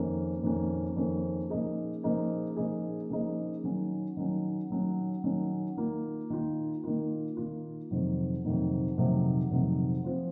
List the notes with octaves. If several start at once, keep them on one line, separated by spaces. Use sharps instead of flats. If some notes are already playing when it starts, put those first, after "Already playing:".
Already playing: F2 D#3 A#3 C#4
F2 D#3 A#3 C#4
F2 D#3 A#3 C#4
C#3 F3 A#3 D#4 G#4
C#3 F3 A#3 D#4 G#4
C#3 F3 A#3 D#4 G#4
C#3 F3 A#3 D#4 G#4
D#3 F#3 C#4
D#3 F#3 C#4
D#3 F#3 C#4
D#3 F#3 C#4
D#3 A#3 F4
D#3 A#3 F4
D#3 A#3 F4
D#3 A#3 F4
F2 C3 D#3 F#3
F2 C3 D#3 F#3
F2 C3 D#3 F#3
F2 C3 D#3 F#3
F3 C4 F4